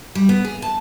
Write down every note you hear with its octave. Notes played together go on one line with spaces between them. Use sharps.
G3
B3
G#4
A5